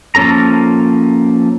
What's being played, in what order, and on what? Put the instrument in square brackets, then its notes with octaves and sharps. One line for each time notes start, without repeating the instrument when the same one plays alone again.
[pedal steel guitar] F3 A#3 C#4 A4 A#5